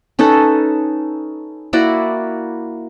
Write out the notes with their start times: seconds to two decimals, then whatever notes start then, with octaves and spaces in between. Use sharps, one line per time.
0.19 C#4 D#4 A4 B4
1.73 A#3 E4 F#4 D5